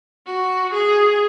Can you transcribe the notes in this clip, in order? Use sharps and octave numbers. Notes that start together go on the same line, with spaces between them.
F#4
G#4